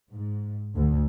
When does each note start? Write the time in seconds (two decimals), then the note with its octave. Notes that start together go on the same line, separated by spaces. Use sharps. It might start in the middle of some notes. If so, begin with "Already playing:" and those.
0.12 G#2
0.76 D2